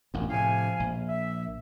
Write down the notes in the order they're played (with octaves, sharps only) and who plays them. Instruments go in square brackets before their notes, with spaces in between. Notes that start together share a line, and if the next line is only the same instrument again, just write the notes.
[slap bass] A1 F#2
[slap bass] A2 C3 [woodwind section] F3 F5 G#5
[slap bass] A#1
[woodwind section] E5